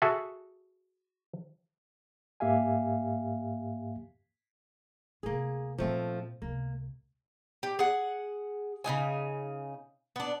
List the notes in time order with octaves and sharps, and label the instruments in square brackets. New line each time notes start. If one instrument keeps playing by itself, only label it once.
[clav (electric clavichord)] F#4 G#4 A4 E5 F#5
[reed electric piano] G#2 A#3 G4 E5 F5 G#5
[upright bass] D2 C3 [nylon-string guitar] A#3 G#4
[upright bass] A#2 G3 [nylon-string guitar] F3 A3 C4
[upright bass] C#2 C3 [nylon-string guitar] A#3
[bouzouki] G4
G#4 F#5
C#3 D4 D#4 G#5
B3 D4